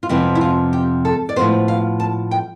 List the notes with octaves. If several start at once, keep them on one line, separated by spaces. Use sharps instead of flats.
F4
F2 C3 F3 B3 E4
E4
F4
G4
A4
D5
A2 F3 B3 C5
F5
A5
G5